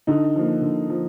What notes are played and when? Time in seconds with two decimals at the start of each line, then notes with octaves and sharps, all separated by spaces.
0.07 D3 D#4
0.36 F3 A#3
0.62 D3
0.90 F3